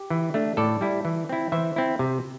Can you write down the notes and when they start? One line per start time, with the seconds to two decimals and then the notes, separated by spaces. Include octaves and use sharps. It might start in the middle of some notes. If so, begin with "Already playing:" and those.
Already playing: G4
0.10 E3
0.34 A3 D4
0.57 A2 A4 D5
0.81 G3 E4
1.05 E3
1.29 C4 E4
1.52 E3 C5 E5
1.76 C4 E4
1.99 C3